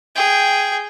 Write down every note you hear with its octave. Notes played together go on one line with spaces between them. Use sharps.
G#4 G5